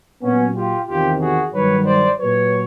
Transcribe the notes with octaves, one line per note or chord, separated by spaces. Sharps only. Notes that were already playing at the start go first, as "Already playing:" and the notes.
A#2 F#3 B3 C#4
F4 G4
E2 C3 D#3 F4 G4
F#4 G#4
G2 D#3 F#3 B4 C#5
C5 D5
A#2 F#3 B4 C#5